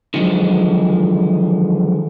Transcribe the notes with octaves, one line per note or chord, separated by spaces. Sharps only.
D3 D#3 F3 F#3 G#3